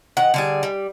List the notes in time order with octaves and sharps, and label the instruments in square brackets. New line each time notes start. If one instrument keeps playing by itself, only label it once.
[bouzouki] D#3 F#5
D3 G3 G#4
G3